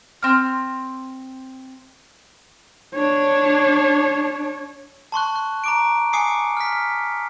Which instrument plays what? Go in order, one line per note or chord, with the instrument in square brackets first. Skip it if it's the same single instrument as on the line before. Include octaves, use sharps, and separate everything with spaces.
[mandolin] C4 F6
[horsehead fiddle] D4 C#5
[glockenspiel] A5 C6 C#6 F#6
F#6
A#5 D6 D7
G#5 D6 D#6 C7 C#7
F6 B6
B6